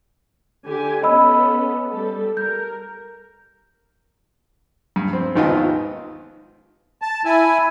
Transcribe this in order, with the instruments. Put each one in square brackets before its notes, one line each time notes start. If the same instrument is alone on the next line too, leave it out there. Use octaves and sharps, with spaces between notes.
[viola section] D3 G4 G#5
[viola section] B3 C#4 A4 [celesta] D#5 B5 E6
[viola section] G3 A4
[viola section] A#4 [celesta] G6
[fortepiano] G2
C4
G#1 D#2 D#3 B3 F4 D#5
[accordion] A5
E4 G#5